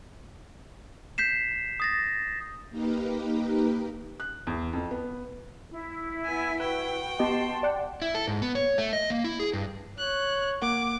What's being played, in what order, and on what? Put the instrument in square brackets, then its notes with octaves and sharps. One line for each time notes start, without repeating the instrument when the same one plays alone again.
[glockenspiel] G6 B6 C7 E7
D#6 A6 A#6
[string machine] A#3 D#4 G4 A#4 B4
[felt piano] F#6
E2
F2
B3
[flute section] E4
[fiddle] B3 G#5
[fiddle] F#4 G5 [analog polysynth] B4
[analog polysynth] B3 G4 D#5 [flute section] A5 C6
[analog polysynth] D5 F#5 G5
[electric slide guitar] E4
A4
G#2
B3
C#5
A3
D#5
A#3
E4
G#4
G2
[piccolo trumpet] C#5 [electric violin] F#6
[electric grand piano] A#3 F#5 [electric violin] D6